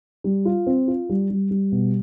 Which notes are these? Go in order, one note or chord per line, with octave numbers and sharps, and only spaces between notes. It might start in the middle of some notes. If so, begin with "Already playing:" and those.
G3
F4
C4
F4
G3
G3
G3
B2